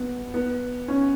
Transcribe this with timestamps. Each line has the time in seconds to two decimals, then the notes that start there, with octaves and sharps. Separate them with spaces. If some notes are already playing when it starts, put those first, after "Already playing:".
Already playing: B3
0.34 B3
0.88 C#4